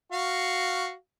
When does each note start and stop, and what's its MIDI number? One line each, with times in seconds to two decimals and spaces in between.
0.12 0.93 66
0.12 0.93 77